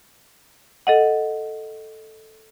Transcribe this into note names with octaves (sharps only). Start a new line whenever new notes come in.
A4 D#5 F#5